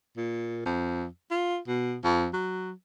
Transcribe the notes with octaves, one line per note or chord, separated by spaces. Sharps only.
A#2
F2
F4
B2
F2
F#3